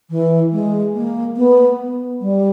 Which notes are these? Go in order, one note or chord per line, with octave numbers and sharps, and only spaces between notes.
E3
G#3
A#3
B3
G3